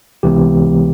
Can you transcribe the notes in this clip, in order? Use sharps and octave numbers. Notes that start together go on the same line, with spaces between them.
C#2 C3 E3 G#3 B3 G4